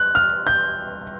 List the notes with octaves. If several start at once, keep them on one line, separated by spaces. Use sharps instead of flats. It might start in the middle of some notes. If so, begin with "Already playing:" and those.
Already playing: F#6
F6
G6